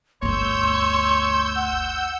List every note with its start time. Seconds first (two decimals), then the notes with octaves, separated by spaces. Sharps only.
0.23 G1 D2 C#5 C6 E6 G6
1.56 F#5